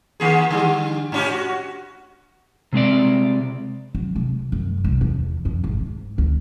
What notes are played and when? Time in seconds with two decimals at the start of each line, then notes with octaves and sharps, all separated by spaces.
0.20 D#3 A#3 G#4
0.51 D3 G3
1.12 G#2 C#4 G4
1.30 F#4
2.73 C3 G#3 C4 D5
3.95 F#3
4.15 C3
4.52 F#2
4.84 C2
5.01 E2
5.45 F2
5.64 G#1
5.80 G#2
6.18 D2